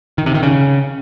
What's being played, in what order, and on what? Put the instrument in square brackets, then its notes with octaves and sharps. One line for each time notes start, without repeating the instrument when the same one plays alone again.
[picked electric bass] D#3
C3
D#3
C#3